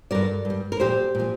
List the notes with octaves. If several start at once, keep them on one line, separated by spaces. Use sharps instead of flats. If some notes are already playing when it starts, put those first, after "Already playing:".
G2 G3 A#4 D5
G2
G3
A#4
A#2 F3 G4 C5
A#2 F3